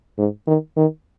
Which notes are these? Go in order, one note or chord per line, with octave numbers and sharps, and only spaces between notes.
G#2
D#3
D#3